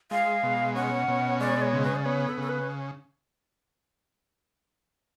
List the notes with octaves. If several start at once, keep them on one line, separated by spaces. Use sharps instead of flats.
G#3 F5
B2
C#4 F#5
B2
G#3 D5
C#5
C#3
B4
D5
B3 C#5
A4
C#3 A4
B4